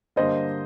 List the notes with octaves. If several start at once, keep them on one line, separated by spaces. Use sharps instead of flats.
G2 D3 G3 A#3 C5 D#5